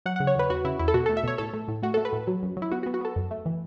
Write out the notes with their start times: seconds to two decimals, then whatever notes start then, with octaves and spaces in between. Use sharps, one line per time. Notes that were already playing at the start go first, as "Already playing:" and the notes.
0.06 F#3 F#5
0.16 C#3 F#5
0.27 C#5
0.35 E2 B4
0.49 E2 F#4
0.64 C#3 E4
0.79 E2 E4
0.88 A4
0.94 B2 F#4
1.06 A3 A4
1.17 E5
1.24 B2 C#5
1.38 A2 A4
1.53 A3
1.68 A2
1.83 A3 F#4
1.94 A3 A4
2.05 B4
2.13 A2
2.27 F#3
2.42 F#2
2.57 F#3
2.62 E4
2.72 B3 F#4
2.83 F#4
2.86 B3
2.94 F#4
3.01 B3 A4
3.16 F#2
3.31 A3
3.46 E3